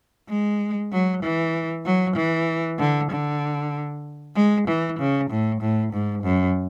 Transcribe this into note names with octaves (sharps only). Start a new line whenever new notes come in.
G#3
F#3
E3
F#3
E3
D3
D3
G#3
E3
C#3
A2
A2
G#2
F#2